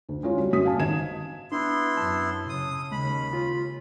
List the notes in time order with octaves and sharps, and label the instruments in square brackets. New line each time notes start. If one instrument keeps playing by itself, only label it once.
[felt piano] D2
G#3 C#4 F4
F#3 G3 C4
F#2 F#4 D#6 B6
F5 G#5 A5
G#1 G#6 E7
[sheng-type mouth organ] B3 E4 C6 [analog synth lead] D4
[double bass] F#2 [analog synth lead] A5
[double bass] C#3 [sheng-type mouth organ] D#6
[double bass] D#2 C#3 [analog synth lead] G#3 [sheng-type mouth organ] B5
[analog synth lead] F4